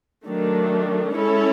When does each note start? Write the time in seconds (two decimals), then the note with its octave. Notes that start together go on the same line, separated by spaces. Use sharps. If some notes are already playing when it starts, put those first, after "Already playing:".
0.25 D#3 F#3 A3 D4
1.13 G#3 C#4 E4 A4 C#5